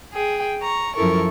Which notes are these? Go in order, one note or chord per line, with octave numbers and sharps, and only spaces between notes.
G#4 G5
A#5 C#6
F#2 F3 E4 A4 A#4 C#6